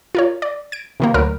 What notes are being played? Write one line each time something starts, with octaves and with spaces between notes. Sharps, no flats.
F4 A#4 C#5
D5
G#6 D7
C3 D#3 A#3
D2 F#3 A#4 B5 F6 D7